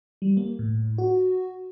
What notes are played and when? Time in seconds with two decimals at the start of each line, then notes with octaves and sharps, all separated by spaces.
0.22 G3
0.37 A#3
0.59 A2
0.98 F#4